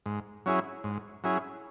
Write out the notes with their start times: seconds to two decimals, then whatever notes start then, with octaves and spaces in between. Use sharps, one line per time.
0.06 G#2
0.46 F#3 C#4 E4 G#4
0.84 G#2
1.24 F#3 C#4 E4 G#4